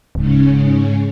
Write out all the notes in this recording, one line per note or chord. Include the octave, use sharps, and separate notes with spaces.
D1 G#2 C#3 C#4